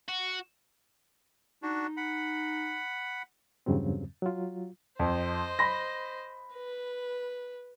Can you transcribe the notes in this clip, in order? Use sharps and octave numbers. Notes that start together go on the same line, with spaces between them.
F#4
D4 D#4 F#4
F#5 B5
E2 G2 C#3 F#3 C4
F#3 F4
F2 C5 D#5
B5 A#6
B4